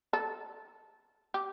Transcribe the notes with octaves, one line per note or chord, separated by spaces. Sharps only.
A4
G4